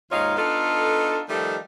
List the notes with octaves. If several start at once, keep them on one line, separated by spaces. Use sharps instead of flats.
D#2 G#2 D#4 F4 C#5 F5
B3 D4 D#4 F4 A4
D#3 F3 G3 A3 D#5